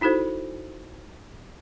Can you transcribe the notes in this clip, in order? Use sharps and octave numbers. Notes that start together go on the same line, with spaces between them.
D#4 E4 F#4 A4 C5